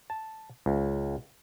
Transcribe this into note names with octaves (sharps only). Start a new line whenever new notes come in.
A5
C#2